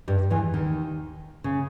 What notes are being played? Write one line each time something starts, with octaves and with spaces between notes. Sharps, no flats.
G2 G3
E2 E3
D#2 D#3
C#3